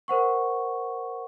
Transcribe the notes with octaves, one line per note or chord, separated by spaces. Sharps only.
A#4 C5 F#5 C#6